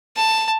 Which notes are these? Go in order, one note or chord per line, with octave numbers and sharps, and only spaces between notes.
A5